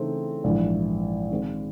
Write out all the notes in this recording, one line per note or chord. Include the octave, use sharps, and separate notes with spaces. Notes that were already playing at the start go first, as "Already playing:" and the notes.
Already playing: C#3 E3 A3 C4 D#4
A#1 G#2 E3
D#3 G#3 C4